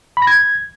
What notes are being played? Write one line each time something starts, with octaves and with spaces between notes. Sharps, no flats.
B5
A#6
G#6